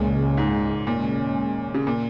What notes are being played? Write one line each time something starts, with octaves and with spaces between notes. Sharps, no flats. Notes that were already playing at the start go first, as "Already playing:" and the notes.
Already playing: C#2 A#2 C#3 G#3
G#2
D#2 A#2 C#3 G#3 C#4
C#3
A#2